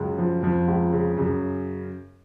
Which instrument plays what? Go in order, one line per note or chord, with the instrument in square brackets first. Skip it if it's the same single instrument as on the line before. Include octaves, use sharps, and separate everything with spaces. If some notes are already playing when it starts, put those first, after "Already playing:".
Already playing: [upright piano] C#2 C#3 [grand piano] F#2
[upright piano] F3
[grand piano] F2 [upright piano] F3
[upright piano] C#2
C#3
[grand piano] F#2 [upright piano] C#3